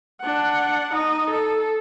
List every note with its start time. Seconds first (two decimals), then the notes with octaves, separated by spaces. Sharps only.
0.22 D4 F#5
0.94 D#4 D#5
1.31 A4